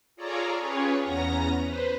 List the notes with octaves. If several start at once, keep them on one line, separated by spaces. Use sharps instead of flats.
F4 G#4 A4 C#5 D5 A#5
C#4 F4 G4 G#4 B4 C#5
E2 B3 C#4 A#5 A#6
B4 C5